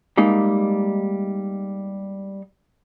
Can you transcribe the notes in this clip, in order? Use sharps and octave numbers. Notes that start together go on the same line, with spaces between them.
G3 G#3 A#3 D#4